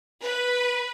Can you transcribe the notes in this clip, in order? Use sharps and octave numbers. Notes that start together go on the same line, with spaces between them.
B4